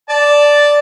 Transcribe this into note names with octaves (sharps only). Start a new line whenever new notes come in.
D5 A5